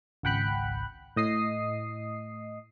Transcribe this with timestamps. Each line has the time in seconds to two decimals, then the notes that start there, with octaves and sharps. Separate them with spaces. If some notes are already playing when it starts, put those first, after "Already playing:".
0.23 G#1 C#2 F#5 G5 B5 F#6
1.16 A2 D#5 D#6 C7